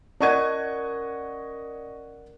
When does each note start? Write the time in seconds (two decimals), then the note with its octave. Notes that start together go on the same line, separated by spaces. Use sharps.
0.21 C#4 A#4 D5 D#5 F#5 C#6 G#6 D#7